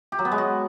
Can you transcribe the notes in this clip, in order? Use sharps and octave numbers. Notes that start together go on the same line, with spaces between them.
G4
F#3
B3
G#3
F#4